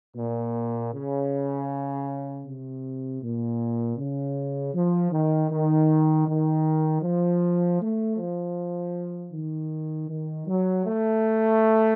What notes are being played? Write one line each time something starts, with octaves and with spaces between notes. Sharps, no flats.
A#2
C#3
C3
A#2
C#3
F3
D#3
D#3
D#3
F3
A3
F3
D#3
D#3
F#3
A3